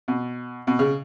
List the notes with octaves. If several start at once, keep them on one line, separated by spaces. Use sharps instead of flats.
B2
B2
C#3